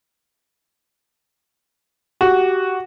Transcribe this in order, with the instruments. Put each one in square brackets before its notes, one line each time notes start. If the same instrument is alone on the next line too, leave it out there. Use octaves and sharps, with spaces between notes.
[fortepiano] F#4 [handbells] G4